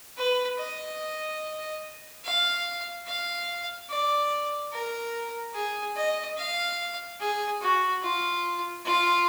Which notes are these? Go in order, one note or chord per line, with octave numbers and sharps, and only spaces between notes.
B4
D#5
F5
F5
D5
A#4
G#4
D#5
F5
G#4
F#4
F4
F4